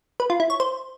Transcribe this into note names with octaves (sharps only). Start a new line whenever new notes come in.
B4
F4
E4
C#5
C5